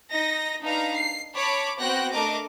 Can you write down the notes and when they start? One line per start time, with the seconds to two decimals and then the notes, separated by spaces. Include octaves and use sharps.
0.12 D#4 D#5 A#6
0.63 D4 D#4 B4 F5 A#5
0.96 C7
1.35 C#5 A5 B5 D6
1.80 B3 C4 F#4 G5 F#6 A#6
2.12 A3 D4 A#4 D#5 D6